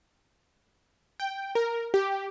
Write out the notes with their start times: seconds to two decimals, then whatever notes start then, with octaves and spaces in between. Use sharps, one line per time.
1.20 G5
1.55 A#4
1.94 G4